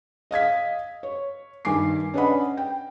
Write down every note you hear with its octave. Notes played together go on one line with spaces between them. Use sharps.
D#5 F5 G#6 B6
C#5
G2 D#3 G#5 D6 C7
C#4 D4 B4 D#5 F#5 B5
G5